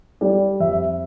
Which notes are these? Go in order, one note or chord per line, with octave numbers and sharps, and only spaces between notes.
G3 D5
F2 E5